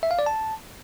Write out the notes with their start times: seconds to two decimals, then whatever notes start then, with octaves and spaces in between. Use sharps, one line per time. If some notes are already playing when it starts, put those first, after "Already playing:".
0.03 E5
0.11 F5
0.19 D5
0.26 A5